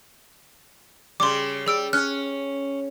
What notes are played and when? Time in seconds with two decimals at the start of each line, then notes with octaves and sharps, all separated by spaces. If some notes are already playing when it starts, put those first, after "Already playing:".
1.20 C#3 G3 C6 D6
1.66 G3 G#4 E6 D7
1.93 C#4 F6 F#6